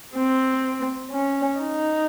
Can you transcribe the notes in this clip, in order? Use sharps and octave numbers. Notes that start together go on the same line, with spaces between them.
C4
C#4
D#4